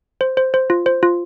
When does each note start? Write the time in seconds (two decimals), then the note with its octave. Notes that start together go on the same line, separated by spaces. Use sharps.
0.21 C5
0.37 C5
0.54 C5
0.70 F4
0.86 C5
1.03 F4